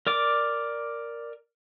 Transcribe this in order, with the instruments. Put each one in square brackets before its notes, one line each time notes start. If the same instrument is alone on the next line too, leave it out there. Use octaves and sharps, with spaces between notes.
[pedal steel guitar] A#4 D5 D6